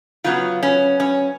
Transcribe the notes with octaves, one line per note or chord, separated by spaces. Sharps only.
C#3 F#3 B3 F4
C#4
C#4